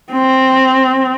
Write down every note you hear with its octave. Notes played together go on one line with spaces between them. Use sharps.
C4